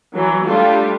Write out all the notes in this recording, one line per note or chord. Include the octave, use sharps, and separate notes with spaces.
E3 F#3
G3 A3 D4 F4 G4